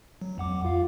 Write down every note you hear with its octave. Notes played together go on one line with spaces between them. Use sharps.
F#3
F2 F#5 D6
F4 F5